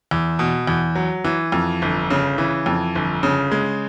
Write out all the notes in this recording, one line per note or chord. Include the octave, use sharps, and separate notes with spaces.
E2
B2
E2
F#3
E3
F2
G1
C#3
E3
F2
G1
C#3
G#3